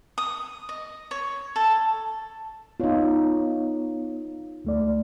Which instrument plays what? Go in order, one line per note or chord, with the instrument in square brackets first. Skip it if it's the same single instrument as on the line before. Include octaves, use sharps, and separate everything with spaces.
[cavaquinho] D#6
D#5
C#5
A4
[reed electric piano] B3 C#5 [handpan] D#4 F4
[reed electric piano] D2 A3 D5